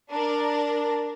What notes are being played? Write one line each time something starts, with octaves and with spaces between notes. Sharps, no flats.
D4 A#4